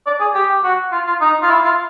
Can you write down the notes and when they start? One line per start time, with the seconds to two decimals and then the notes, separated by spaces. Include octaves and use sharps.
0.06 D5
0.20 G#4
0.35 G4
0.64 F#4
0.92 F4
1.06 F4
1.21 D#4
1.42 F4
1.49 E4
1.64 F4